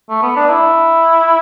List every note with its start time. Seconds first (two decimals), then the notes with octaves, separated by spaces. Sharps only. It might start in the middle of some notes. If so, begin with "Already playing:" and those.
0.09 A3
0.22 B3
0.36 D4
0.49 E4